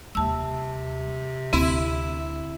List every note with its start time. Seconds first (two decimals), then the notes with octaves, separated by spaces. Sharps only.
0.15 D#2 C3 G3 A5 E6
1.53 D2 C4 E4